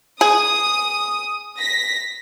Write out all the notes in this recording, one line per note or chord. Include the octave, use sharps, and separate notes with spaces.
G#4 D#6
A#6 B6